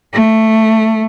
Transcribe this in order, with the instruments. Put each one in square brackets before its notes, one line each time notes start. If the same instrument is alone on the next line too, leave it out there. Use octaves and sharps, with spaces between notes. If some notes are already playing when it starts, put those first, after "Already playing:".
[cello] A3